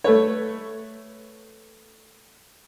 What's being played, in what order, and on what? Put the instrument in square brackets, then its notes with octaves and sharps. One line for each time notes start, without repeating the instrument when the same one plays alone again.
[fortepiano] A3 A4 B4 C#5